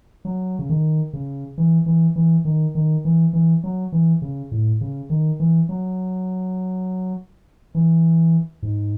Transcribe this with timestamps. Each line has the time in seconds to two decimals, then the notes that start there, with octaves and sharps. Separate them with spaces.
0.25 F#3
0.59 C#3
0.70 D#3
1.13 C#3
1.58 E3
1.86 E3
2.16 E3
2.45 D#3
2.75 D#3
3.05 E3
3.33 E3
3.64 F#3
3.92 E3
4.22 C#3
4.52 A2
4.81 C#3
5.10 D#3
5.40 E3
5.69 F#3
7.75 E3
8.63 G#2